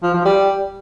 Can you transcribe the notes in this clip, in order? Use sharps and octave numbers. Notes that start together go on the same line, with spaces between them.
F3
F3
G3